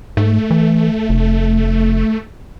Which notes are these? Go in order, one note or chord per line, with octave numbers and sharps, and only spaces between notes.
G#2 A3
E3
F1